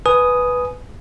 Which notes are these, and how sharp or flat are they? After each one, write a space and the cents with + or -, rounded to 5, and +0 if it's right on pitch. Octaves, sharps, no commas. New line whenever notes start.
B4 +0 G#5 +15 D#6 +0